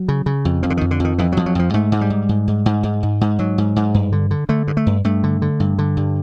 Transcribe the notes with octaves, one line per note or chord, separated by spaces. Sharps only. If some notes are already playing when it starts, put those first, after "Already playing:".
Already playing: F#3
C#3
C#3
F2
F2 F3
D3
F2 D#3
D3
F2 D#3
F2 E3
F2 F#3
F#3
F2 F3
G#2 A3
G#2
G3
G#2
G#2
G#2
G#2
G#2
G#2
G#2
G#2 F#3
G#2
G#2
G2
D3
D3
D3 A3
G2
A3
G2
G2 A3
D3
D3
G2
D3
G2